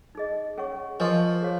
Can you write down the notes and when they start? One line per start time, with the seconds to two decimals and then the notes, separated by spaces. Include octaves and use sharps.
0.15 D#4 G#4 D#5
0.58 C#4 G#4 C#5 F#5 C#6
1.00 F3 A#4 D#5 G#5 C#6
1.42 G#4 C#5 F5